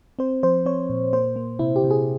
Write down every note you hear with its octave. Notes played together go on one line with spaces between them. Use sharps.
C4 C5
F3 C5
C4 C#5
A#2
A#3 C5
A#3
C3 E4
G4
C3
G#4